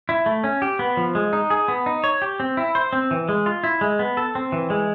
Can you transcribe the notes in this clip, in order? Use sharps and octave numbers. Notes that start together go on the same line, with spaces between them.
E4
A3
C#4
G4
B3
F3
G#3
D#4
G#4
B3
D#4
C#5
G4
C4
E4
C5
C4
E3
G#3
F4
E4
G#3
B3
A4
C4
E3
G#3